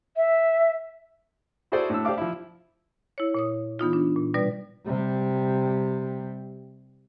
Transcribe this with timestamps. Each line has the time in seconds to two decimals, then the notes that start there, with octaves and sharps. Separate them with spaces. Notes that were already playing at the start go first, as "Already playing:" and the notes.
0.16 E5
1.72 E4 F#4 G#4 A4 C5 D5
1.90 A2 D4 E6
2.05 G4 C5 D5 F5 D6
2.18 F3 E4
3.18 E4 C#5
3.34 A#2 C#5 D#6
3.79 E3 B3 D#4 F4
3.93 D4
4.16 A#2
4.34 B2 G3 B4 D5
4.86 C3 G3